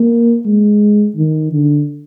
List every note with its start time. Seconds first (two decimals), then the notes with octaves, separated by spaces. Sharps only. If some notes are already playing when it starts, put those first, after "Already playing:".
Already playing: A#3
0.46 G#3
1.16 D#3
1.53 D3